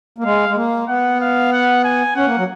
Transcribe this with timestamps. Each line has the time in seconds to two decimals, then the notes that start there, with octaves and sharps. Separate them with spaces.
0.18 A#3
0.23 G#3 F5
0.49 G#3
0.56 A#3
0.88 B3 F#5
1.21 F5
1.52 F#5
1.84 G#5
2.16 C#4 F#5
2.26 A#3
2.38 F#3